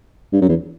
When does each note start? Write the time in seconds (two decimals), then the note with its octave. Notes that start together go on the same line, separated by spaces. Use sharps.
0.33 G2
0.41 F#2
0.49 E2